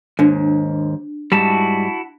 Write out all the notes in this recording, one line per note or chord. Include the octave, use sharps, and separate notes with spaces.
D#2 G#2 D4
G#2 G3 E4 F#4 A5